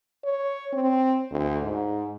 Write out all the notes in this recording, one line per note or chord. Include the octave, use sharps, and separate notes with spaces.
C#5
C4
D2
G#2